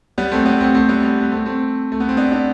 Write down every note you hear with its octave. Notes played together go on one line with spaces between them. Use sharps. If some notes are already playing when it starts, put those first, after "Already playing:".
G3 B3
A3 C4
G3 B3
A3 C4
A3 C4
G3 B3
G3 B3
B3
A3 C4
A3 C4
A3
B3
C4
B3 D4
B3 D4